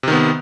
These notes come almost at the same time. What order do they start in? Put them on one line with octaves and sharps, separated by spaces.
C3 D#3 B3